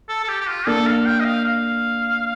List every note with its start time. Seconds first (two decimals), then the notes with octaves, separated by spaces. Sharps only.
0.09 A4
0.24 A4
0.28 G4
0.41 G4
0.48 F4
0.67 A#3 D4 A4
0.87 F5
1.05 G5
1.20 D#5
1.25 F5
1.44 F5